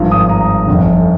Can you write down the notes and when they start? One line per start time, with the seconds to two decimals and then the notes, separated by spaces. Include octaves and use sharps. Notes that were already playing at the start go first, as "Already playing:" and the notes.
Already playing: G#1 G2 F3
0.11 D#6
0.29 A#5
0.67 G1 F2 D3